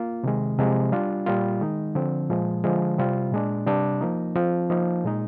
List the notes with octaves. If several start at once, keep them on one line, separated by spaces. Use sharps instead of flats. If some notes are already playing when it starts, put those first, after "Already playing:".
Already playing: A#3 F4
C3 D#3 G#3
C3 F3 G#3
G3 D4 F4
A#2 G3 A#3 F4
D#3 G#3 D#4
D3 F3 C4
A#2 F3 G#3
D3 F3 G#3
C3 G3 C4 F4
A#2 G#3 D4
C3 G3 D4
F3 A#3 D#4
F3 C4 F4
F3 A#3 D#4
A#2 G#3 D#4